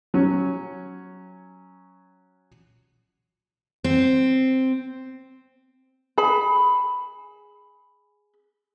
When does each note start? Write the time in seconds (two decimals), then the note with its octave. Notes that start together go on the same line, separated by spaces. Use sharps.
0.14 F#3 C#4
3.84 C4
6.18 G#4 B5